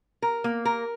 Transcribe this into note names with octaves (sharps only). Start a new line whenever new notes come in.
A#4
A#3
A#4